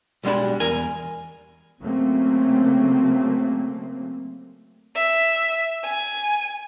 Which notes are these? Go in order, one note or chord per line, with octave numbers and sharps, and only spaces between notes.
B1 G3 G#3 D4 B5
E2 A#4 G#5
C#3 F#3 A3 A#3 C4
E5
G#5